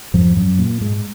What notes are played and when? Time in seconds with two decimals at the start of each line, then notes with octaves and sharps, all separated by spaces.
0.14 F2 G#2 F3
0.37 F#2 F#3
0.58 A#2 A#3
0.81 G#2 G#3